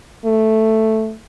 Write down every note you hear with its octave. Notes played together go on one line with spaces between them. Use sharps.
A3